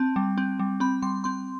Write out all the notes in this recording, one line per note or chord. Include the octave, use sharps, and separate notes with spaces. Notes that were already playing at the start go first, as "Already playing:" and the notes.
Already playing: C4 A5
G3
C4
G3
C4 B5
G3 C6
C4 C6